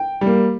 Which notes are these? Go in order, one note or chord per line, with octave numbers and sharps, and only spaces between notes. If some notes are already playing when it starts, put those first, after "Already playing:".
Already playing: G5
G3
A#3